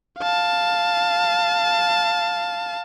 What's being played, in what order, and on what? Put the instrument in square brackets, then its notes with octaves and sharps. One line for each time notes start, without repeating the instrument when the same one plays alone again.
[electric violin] F5 A5